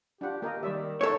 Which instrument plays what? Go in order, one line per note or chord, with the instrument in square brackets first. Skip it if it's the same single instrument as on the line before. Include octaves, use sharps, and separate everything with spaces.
[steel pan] D4 F4 F#5 [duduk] G4
[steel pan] A#3 A#4 D#5 [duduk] G4
[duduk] D#3 [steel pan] G3 D5 E5
[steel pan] A#3 D#4 [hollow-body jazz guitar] A4 C#5